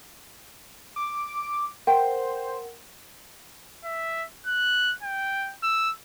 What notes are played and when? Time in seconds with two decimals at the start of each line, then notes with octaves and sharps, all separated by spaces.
0.96 D6
1.87 A#4 C5 F#5 G5
3.85 E5
4.47 F#6
5.03 G5
5.63 E6